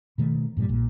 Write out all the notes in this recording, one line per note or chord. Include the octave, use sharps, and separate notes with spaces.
B2 D#3 A3
G2 A#2 E3 G3
A#1 A#2